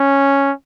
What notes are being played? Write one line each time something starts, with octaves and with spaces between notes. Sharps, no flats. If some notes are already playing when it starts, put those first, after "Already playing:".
Already playing: C#4